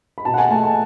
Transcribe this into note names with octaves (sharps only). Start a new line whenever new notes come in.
B5
B2 A5
F#5
G#5
A3 A5
A5